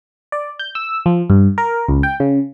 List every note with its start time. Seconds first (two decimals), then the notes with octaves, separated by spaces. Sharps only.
0.32 D5
0.59 G6
0.75 E6
1.06 F3
1.30 G2
1.58 A#4
1.88 C#2
2.03 G5
2.20 C#3